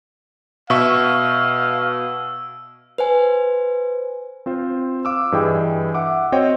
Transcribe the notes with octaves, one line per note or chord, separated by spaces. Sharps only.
B2 E5 F5 C#6 E6
B4 C5 G#5
C4 F4 C5
F5 D6 E6
G2 E3 G#4 D#5 G5
E5 F#5 D6
C4 F#4 C5 C#5 D#5 G5